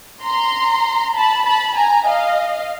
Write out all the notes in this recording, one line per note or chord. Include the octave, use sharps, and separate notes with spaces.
A#5 C6
A5 B5
A5 B5
G#5 A#5
D#5 F5